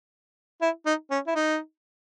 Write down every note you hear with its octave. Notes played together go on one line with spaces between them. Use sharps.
E4
D#4
C#4
E4
D#4